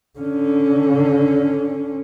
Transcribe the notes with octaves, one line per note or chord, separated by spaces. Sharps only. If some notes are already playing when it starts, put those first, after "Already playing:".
D3 C#4